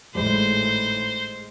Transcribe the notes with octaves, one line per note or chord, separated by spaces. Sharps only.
G#1 A2 G#3 C5 D5